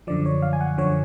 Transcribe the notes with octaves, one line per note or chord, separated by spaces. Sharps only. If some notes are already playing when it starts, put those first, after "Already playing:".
F#2 D3 F3 D5
C#5
F5
G#5
F#5
F#2 D3 F3 C#5